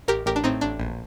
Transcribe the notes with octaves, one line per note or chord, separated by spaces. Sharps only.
A1 G4 A#4
A1 G4 A#4
D4
A2 C4 D#4
A1 D4
A#1